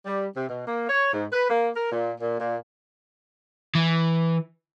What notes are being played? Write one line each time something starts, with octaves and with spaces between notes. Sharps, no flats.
G3
C3
B2
A#3
C#5
G#2
B4
A#3
A#4
A#2
A#2
A#2
E3